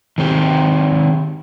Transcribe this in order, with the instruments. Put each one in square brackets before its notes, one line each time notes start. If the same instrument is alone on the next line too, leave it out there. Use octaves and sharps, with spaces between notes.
[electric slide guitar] D#3 C4 G4